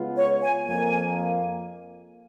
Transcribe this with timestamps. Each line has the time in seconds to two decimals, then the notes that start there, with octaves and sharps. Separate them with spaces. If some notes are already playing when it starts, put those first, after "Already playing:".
Already playing: C#3 G#3 B3 F4
0.17 C#5
0.42 G#5
0.67 F2 F3 A#3 G#5